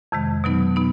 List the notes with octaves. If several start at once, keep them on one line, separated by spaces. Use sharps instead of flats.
F2 C3 D#3 G#3
B2 F#3 B3 D#4
B2 B3 D#4